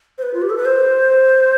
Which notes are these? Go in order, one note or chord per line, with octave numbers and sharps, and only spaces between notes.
C5
B4
F4
G4
A4
B4
C5